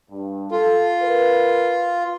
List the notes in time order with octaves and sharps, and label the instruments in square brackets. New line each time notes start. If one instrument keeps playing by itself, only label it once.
[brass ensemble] G2
[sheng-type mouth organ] F4 [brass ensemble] A4
[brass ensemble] A#4 B4